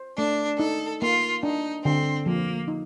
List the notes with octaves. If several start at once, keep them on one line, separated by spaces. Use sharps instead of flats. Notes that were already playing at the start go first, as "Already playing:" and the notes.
Already playing: C5
A3 D4
D#4 A4
A#3 F4
D4 D#4
D3 C4
F3 A#3
D#4